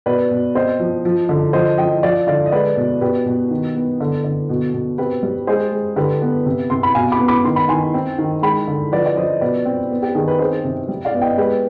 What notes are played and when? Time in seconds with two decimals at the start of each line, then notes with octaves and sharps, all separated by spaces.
0.06 B2 B4 D5
0.31 B2
0.55 C4 C5 D#5
0.79 F3
1.05 F3
1.29 D3
1.53 F3 C5 D#5
1.78 F3 D#5 G5
2.03 F3 D5 F5
2.27 D3 D5 F5
2.46 D#5
2.52 G#3 B4 D5
2.76 B2
3.01 B2 G4 B4
3.26 B2
3.51 D#3
3.76 B3
4.01 D3
4.24 D3
4.49 B2
4.74 B2
4.98 C4 G4 B4
5.23 G3
5.47 G#3 G#4 C5
5.72 G#3
5.96 D3 G4 B4
6.22 B3
6.46 C3
6.70 C3 C6
6.83 B5
6.95 B2 F5 G#5
7.12 B5 D6
7.20 B3
7.28 B5 D6
7.44 D#3 C6
7.56 B5
7.69 D#3 G#5 C6
7.94 C4
8.18 D#3
8.42 G#3 G5 B5
8.68 D3
8.92 F3 B4 D5
9.06 D5
9.16 F3 C5 D#5
9.41 B2 B4 D5
9.65 C4
9.91 B3
10.02 G4
10.15 D#3 G#4
10.28 B4
10.39 C4 G#4 C5
10.64 C3
10.88 G3
11.05 D5 F5
11.14 B3
11.21 D#5 G5
11.38 G#3 G4 B4